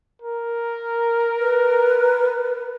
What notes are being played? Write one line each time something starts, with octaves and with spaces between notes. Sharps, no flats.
A#4
B4